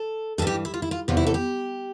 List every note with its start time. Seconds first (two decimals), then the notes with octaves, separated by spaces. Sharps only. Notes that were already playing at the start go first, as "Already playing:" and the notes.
Already playing: A4
0.38 G2 A4
0.42 E3 G4
0.65 E4
0.74 F4
0.82 E4
0.91 F4
1.08 E2 C3 E3 F4
1.17 E4
1.27 A4
1.34 G4